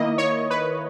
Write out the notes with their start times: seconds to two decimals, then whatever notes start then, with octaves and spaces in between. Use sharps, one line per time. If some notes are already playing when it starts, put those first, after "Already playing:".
Already playing: D#3 A#3 E4 D#5
0.18 C#5
0.50 B4